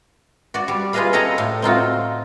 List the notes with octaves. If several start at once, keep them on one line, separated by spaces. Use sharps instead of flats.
F#4 D5
G3
F4 G#4 B4 D#5 F5 B5
A4 C#5 D#5 G5 A5 A#5
A2
C4 D#4 F4 F#4